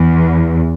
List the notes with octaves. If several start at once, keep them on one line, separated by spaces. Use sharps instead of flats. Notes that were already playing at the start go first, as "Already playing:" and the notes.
Already playing: E2